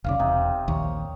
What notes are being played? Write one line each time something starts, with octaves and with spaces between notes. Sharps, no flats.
F1 B1 C#3 D5 F5
E1 C3 D#4
A#1 D#2 C#5